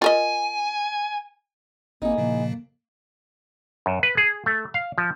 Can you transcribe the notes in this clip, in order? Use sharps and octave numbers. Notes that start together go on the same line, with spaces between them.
F4 A#4 D#5 G#5
G#1 A#3 C4 D#4 E4 G#4
A#2 C#3 F3 A#3
F#2
B4
G#4
A3
F5
F3